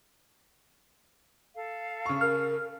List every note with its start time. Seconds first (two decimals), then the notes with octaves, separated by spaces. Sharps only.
1.55 A4 F5
2.06 C#3 C#6
2.21 A#4 F6